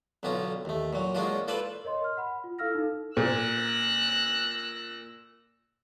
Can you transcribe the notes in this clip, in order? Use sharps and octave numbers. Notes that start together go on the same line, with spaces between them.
B1 D3 B3 C#4 F4 A#5
D#2 A3
A#2 F#3
G#3 A#3 C#4 D4 F4 F#4
F4 A4 B4 C5 D5 B5
A#4 C#5 D#5 C6
F6
F#5 B5
F4
E4 A4 F5 E6 F6 A#6
D#4 A4
A#2 E6 F#6 A#6